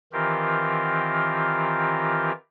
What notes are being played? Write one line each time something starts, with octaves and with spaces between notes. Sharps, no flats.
D#3 E3 C4 F4 G4 A#4